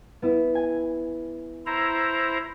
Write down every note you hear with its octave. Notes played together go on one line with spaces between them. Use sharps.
B3 E4
G#5
E4 C5 A#5